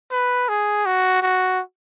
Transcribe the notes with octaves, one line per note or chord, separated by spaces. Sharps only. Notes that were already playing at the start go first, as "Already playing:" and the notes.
B4
G#4
F#4
F#4